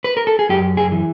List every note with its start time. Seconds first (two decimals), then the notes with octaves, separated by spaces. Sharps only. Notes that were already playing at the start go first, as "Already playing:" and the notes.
0.04 B4
0.17 A#4
0.27 A4
0.39 G#4
0.49 F#2 G4
0.77 G#4
0.92 E3